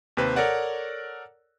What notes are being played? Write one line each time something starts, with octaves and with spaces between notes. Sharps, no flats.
D#2 C3 B4 C5
A4 A#4 C#5 D5 F#5